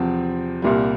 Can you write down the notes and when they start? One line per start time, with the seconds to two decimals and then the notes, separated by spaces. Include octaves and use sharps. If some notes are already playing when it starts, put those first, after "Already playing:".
Already playing: E2 C3 F3 C4
0.62 C2 A#2 G3